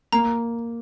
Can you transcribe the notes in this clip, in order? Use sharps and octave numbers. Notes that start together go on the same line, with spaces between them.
A#3 A#5